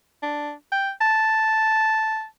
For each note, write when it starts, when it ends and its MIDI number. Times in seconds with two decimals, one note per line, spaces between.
0.23 0.52 62
0.72 0.90 79
1.01 2.25 81